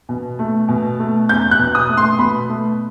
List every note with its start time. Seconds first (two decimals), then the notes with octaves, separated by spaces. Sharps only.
0.09 B2
0.39 A3
0.68 B2
0.99 A3
1.29 E2 G6
1.51 F#6
1.59 B2
1.75 D#6
1.89 A3
1.97 C6
2.19 B2 B5
2.49 A3